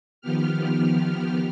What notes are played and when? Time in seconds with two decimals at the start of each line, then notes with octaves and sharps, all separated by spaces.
0.21 D#3 F3 B3 G4 F6